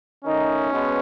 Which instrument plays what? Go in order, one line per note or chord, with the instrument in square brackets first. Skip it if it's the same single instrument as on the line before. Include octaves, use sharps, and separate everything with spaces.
[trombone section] D#3 A3 D#4 [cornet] C#4
[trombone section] B2 G#3 B3